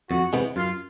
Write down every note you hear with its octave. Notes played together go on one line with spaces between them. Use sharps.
F2 F#4
C3 E3 G#3 B3
F#2 F4